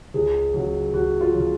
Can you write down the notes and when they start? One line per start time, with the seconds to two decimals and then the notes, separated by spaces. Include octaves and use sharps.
0.14 C#2 G#4
0.54 C#3 F#3
0.93 C#2 F#4
1.21 F4
1.34 C#3 F#3